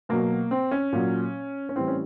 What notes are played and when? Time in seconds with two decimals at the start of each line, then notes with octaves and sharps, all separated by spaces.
0.09 B2 F#3 A#3
0.51 C4
0.71 C#4
0.93 A#2 F#3
1.69 C#4
1.75 A2 E3 G3 C4
1.88 C#4